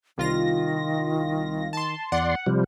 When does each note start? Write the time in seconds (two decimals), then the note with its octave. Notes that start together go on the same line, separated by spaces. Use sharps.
0.18 C2 D#3 F4 A#6
1.73 A5 C6
2.12 E2 D5 F#5 C6
2.46 C3 F3 G3